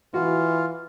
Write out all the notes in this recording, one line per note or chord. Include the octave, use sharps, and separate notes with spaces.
E3 F4 F#4